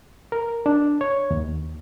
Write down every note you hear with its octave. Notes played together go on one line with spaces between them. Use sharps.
A#4
D4
C#5
D#2